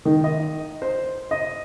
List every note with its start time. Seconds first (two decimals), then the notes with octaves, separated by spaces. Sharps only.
0.05 D#3
0.24 D#5
0.82 C5
1.31 D#5